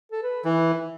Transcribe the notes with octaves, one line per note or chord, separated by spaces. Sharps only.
A4
B4
E3